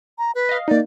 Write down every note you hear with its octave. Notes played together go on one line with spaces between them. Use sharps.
A#5
B4
D#5 F5
A#3 D#4 D5